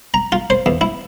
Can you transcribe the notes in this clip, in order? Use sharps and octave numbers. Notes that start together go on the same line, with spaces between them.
A#5
F4
C5
E2
E4